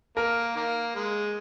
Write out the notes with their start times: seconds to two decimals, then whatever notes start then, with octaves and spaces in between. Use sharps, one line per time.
0.17 A#3 A#4
0.56 D#3 A#3
0.95 G#3